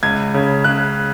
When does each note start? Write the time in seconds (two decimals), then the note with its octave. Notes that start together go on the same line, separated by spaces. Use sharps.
0.03 C#2 G#6
0.34 C#3
0.64 C#3 F#6